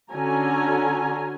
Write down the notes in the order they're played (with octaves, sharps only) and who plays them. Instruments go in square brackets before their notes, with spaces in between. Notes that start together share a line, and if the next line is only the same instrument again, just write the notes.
[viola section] D3 C#4 F#4 G#5 A#5